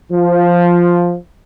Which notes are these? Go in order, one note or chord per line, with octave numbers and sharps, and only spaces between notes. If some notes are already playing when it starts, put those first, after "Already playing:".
F3